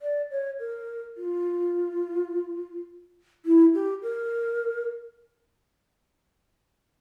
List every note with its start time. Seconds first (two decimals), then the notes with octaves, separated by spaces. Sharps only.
0.02 D5
0.31 C#5
0.60 A#4
1.17 F4
3.45 E4
3.74 G4
4.03 A#4